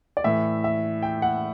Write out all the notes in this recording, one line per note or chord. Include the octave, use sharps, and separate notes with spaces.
D5
A2 E3 E5
E5
G5
F#5